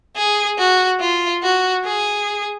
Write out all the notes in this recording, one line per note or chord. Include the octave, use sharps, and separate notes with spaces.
G#4
F#4
F4
F#4
G#4